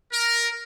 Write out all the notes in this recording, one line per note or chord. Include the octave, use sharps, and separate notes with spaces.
A#4